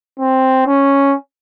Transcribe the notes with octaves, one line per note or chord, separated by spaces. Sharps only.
C4
C#4